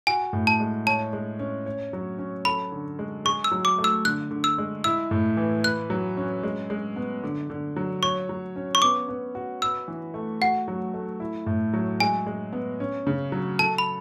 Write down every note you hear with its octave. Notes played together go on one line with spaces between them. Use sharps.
F#4 G#5
A2
A5
G#3
C#5 A5
G#3
C#4
C#5
F#3
C#4
A4 B5
D3
G#3
G#4 C#6
E6
F#3
D6
A3
E6
D3 F#6
D3
E6
G#3
E4 E6
A2
E3
B4 F#6
F#3
C#4
G#3
G#3
B3
D3
D3
F#3
C#5 C#6
F#3
C#4
C#6
B3 D6
B3
F#4
B4 E6
E3
A3
F#4 F#5
F#3
A3
E4
A2
F#3
G#3 G#5
G#3
B3
C#4
C#3
F#3
A4 A5
B5